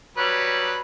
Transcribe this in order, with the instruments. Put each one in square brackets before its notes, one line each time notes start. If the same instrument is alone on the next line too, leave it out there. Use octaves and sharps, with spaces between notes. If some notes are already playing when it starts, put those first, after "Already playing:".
[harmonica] F#3 G3 B4